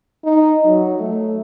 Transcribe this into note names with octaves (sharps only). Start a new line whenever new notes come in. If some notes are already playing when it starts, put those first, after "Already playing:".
D#4
F#3
A3